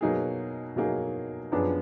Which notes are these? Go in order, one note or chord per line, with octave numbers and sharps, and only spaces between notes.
B2 F#3 A#3 D#4 G#4
B2 F#3 A#3 D#4 G#4
F#2 F3 B3 D4 G#4